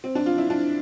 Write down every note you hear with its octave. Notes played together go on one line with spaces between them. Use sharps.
C4
D4
F4
E4
D4